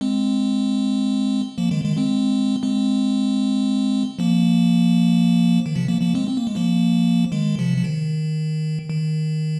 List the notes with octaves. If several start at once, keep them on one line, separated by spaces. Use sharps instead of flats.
G#3 C4
F3 A#3
D#3 G#3
D#3 G#3
G#3 C4
G#3 C4
F3 A#3
D#3
C3 F3
F3 A#3
F3 A#3
G#3 C4
C4
A#3
G#3
F3 A#3
D#3 G#3
C3 F3
F3
D#3
D#3